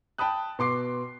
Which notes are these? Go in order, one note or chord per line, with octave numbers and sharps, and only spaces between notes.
G5 A5 B5 D#6 F#6
B2 C6 D6 C7